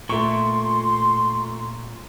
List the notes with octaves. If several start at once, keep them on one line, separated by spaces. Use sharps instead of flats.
A#2 A3 C6 C#6